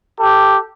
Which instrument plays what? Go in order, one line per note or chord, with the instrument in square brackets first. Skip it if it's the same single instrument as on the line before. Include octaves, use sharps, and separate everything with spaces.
[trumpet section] G4 A4